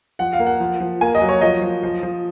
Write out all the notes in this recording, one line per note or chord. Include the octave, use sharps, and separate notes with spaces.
F3 F#5
F5
A#3
F#5
F3
F3
A#3 G#5
D#5
F#3
C#5
F3 D#5
F3
F3
F3